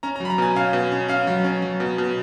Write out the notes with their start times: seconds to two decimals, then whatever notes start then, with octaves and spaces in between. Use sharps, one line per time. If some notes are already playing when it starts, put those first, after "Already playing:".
0.03 C#4 A#5
0.16 A#5
0.20 F#3
0.25 B5
0.30 A#5
0.38 B2 G#5
0.55 C#4 F5
0.73 B2
0.92 C#4
1.09 C#4 F5
1.27 F#3
1.44 C#4
1.62 F#3
1.80 B2
1.98 B2